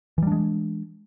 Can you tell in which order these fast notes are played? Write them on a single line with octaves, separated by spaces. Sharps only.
E3 G3 D4 G#3